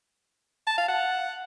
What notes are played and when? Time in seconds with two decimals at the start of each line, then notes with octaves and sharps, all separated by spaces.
0.67 A5
0.78 F5
0.88 F#5